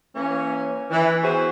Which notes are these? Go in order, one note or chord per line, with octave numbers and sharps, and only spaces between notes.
E3 A#3 C#4
E3
B3 F#4 G#4 C5